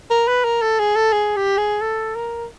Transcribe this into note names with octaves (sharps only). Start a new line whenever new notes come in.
A#4
B4
A#4
A4
G#4
A4
G#4
G4
G#4
A4
A#4